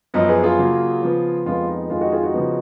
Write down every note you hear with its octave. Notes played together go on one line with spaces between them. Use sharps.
F#2 F3 B3 B4 D#5
G#4 B4
F4 G#4
C#3 F#3 A#3
C#3 F3 B3
F2 F3 G#3 B3 F4
D#4
F2 D#3 G#3 F4
D#4 F#4
F4 G#4
D#4 F#4
C#3 F3 B3